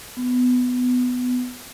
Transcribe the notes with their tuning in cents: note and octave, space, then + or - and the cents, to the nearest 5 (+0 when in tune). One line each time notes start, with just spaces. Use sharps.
B3 +15